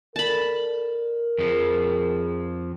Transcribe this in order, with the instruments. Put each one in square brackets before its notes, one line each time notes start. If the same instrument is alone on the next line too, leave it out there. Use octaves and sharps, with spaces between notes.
[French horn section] A4 D5 [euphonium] A#4 [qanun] A5 B5
[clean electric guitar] F2 F3 [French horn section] G#4